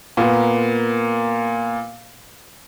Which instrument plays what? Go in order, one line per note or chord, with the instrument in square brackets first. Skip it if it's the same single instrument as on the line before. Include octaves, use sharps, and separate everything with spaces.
[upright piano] A#2 A#3 B3